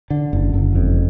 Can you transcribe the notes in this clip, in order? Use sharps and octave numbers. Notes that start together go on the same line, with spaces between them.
D3
F#1
F#1
F2